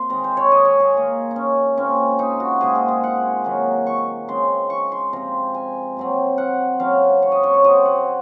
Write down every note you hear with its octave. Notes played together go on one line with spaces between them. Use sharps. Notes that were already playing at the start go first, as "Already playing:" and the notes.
Already playing: C3 A#3 C6
D#3 G#3 C4 A#5
C5
C#5
D#5
C#5
G#4
D#3 A#3
D#4
C#4
A#2 G#3 C4 C#4
D#4
F#4
A#2 G#3 C4 G#4
G#4
G#4
F#5
D#3 F#3 A#3
C#6
C#3 G#3 C4 C6
C#6
C6
C3 F3 C4 A#5
G#5
C3 F#3 C4
F#5
C#3 F#3 C4 F5
C#5
D#5
C#5
C#5
C3 F#3 C4 D#5
F#5